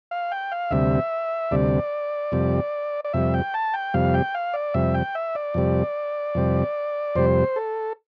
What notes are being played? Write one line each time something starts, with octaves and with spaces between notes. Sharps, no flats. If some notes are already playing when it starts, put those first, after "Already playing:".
F5
G5
F5
D2 C3 G3 E5
D2 C3 G3 D5
F2 C3 G3
D5
F2 C3 G3 E5
G5
A5
G5
F2 C3 G3 F5
G5
F5
D5
F2 C3 G3 E5
G5
E5
D5
F2 C3 G3
F2 C3 G3
F2 C3 G3 C5
A4